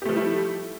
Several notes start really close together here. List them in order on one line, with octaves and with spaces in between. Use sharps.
G4 A3 F3 G3 E4